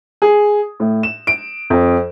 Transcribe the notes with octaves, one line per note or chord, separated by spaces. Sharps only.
G#4
A2
E7
D7
F2